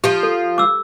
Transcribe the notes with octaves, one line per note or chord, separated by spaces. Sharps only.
F3 F4 G4
A4
D6 E6